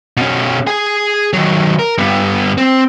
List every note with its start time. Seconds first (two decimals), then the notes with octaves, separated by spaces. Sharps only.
0.17 B2 C#4
0.67 G#4 G#5
1.33 D#3 F#3
1.79 A#4
1.98 G2 B3
2.58 C4